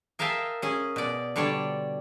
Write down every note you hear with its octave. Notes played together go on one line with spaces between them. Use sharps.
G#4 A#4 E5 F5 G5 A5
C#4 G#4
B2 D5
D3 G3 C#5 D5 A5